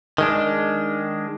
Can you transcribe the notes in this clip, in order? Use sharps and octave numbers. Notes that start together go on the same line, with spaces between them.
D#3 G#3 D4